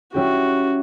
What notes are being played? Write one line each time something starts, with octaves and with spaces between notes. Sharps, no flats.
G3 C#4 E4 F#4 G4